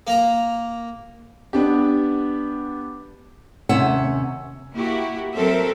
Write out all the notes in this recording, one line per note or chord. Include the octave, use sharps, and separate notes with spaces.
A#3 A#5
B3 D4 G4
D#2 C3 C#4 E5 F#5
A#3 E4 F#4 G4
F#3 C4 A4 A#4 E5